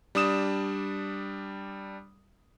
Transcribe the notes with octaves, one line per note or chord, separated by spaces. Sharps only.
G3 D4 D#6 E7